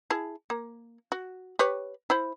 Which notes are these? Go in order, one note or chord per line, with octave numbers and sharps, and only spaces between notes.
E4 G#4 A5
A#3
F#4
G4 B4 C#5
E4 C5 B5